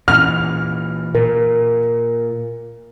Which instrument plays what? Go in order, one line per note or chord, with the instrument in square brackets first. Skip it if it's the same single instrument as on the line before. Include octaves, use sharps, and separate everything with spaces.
[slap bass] A#2 E3 [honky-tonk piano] F6
[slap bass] A#2 [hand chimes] A#4